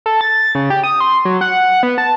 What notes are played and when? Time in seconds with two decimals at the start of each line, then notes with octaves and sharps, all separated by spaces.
0.06 A4
0.21 A6
0.55 C#3
0.70 G4
0.84 D#6
1.00 C6
1.25 F#3
1.41 F#5
1.83 B3
1.98 A5